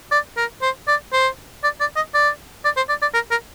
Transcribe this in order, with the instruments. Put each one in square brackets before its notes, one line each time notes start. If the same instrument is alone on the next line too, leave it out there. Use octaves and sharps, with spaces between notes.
[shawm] D5
A#4
C5
D5
C5
D5
D5
D#5
D5
D5
C5
D5
D5
A#4
A#4